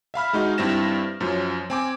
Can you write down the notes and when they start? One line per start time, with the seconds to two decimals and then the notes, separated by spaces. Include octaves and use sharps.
0.14 E5 F5 B5 F6
0.33 G#3 D#4 F#4 D#5
0.58 G2 G3 C4 E4 A#6 E7
1.21 F#2 F3 C#4
1.70 C4 G#5 D6